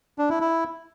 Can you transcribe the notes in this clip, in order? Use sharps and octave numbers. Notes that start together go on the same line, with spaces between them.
D4
E4
E4